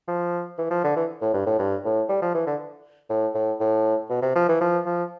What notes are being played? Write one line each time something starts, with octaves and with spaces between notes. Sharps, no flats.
F3
E3
F3
D3
E3
A2
G2
A2
G2
A2
G3
F3
E3
D3
A2
A2
A2
B2
C3
F3
E3
F3
F3